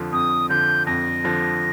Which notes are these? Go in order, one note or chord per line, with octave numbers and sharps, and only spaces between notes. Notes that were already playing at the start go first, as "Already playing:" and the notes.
Already playing: F2 D3 F3
F2 D#6
D3 F3 G6
F2 A#6
D3 F3